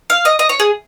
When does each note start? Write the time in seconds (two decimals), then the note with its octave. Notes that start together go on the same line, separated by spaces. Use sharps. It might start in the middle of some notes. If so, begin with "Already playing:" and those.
0.10 F5
0.25 D#5
0.39 D#5
0.49 C#5
0.60 G#4